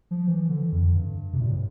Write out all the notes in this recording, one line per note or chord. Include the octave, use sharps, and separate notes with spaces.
F3
E3
D3
F2
G2
C3
A#2
A2